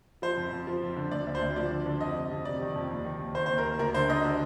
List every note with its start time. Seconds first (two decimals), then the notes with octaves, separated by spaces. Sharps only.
0.22 F3 C5
0.37 F2
0.52 F2
0.67 F3
0.83 F2
0.96 D3
1.11 D2 D5
1.27 D2
1.35 C5
1.41 D2
1.56 F3 D5
1.71 D3
1.86 D3
2.01 F2 D#5
2.16 C3
2.31 F2
2.45 C3 D5
2.61 D#3
2.76 F2
2.91 D#2
3.05 D#3
3.20 D#2
3.34 D#3 C5
3.46 C5
3.50 D#2
3.58 A#4
3.65 D#2
3.79 D2 A#4
3.94 D3 C5
4.09 D3 D#5
4.24 D3